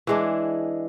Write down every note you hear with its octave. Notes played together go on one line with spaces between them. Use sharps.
E3 G#3 D4